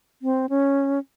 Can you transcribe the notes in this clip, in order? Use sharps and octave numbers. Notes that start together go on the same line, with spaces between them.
C4
C#4